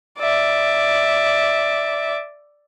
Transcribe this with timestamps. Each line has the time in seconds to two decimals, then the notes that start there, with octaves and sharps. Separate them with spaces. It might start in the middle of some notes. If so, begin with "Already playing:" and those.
0.19 D5 E5